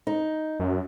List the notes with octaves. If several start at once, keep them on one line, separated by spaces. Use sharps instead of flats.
D#4
F#2